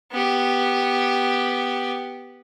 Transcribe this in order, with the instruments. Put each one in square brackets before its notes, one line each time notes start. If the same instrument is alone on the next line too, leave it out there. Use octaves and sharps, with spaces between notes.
[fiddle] B3 G4